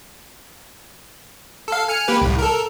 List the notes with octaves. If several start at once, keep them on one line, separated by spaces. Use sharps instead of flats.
A4 F5
G#5 F6 C#7
A#3 G4 B4
C2 A2
A4 A#4